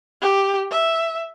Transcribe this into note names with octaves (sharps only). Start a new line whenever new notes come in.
G4
E5